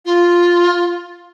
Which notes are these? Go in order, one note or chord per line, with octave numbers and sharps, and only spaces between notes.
F4